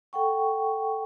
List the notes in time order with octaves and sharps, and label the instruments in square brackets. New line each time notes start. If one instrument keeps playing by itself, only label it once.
[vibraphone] A4 F#5 G5 C#6